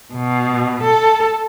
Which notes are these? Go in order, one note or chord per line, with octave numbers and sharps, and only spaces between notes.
B2
A4